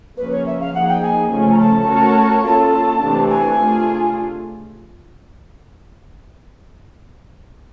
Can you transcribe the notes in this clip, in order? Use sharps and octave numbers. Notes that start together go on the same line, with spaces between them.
C#3 F3 A#3 C#4 B4
C#5
E5
F5
F3 A#3 D#4 G#4 F#5
G5
G#5
C#3 F3 A3 C#4
A#5
A5
A3 C#4 F#4 A#4 C#5
A#3 C#4 F4 A4 A5
C3 E3 A3 D4
G#5
A3 D4 F4 G#4